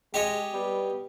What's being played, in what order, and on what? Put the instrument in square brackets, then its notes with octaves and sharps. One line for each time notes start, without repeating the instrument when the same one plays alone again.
[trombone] G#3 [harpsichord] G4 C#5 D#5
[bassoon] G3 [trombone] B3